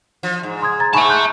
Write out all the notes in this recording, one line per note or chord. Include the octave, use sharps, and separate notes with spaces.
F3
G#2
C6 D#6 G#6
A#5 G#6 A6
G#2 E5 G#5 A5 B5 C#6
C6 F#6 G6